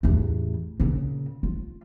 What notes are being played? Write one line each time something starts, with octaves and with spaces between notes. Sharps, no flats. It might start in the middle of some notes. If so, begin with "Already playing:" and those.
A1 E2
A#2 C#3
F4